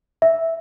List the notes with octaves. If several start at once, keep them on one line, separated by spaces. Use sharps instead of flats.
E5